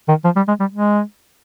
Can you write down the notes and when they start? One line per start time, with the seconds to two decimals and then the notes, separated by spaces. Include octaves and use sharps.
0.09 D#3
0.25 F3
0.36 G3
0.48 G#3
0.60 G3
0.72 G#3